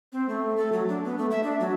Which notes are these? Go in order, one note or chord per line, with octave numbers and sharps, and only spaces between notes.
C4
A3
A4
F#3
D4
B3
A3
E5
D4
F#3